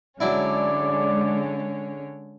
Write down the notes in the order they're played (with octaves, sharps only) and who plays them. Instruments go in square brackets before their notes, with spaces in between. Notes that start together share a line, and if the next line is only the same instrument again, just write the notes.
[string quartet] D3 C#4 [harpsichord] F#3 D4 E4 [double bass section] G#3 [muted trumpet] D5